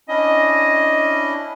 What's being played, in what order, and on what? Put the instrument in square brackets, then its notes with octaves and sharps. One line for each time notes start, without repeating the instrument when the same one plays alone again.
[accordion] C#4 D4 E4 [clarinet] D#5